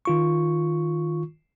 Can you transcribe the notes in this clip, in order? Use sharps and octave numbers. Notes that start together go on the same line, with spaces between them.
D#3 F4 C#6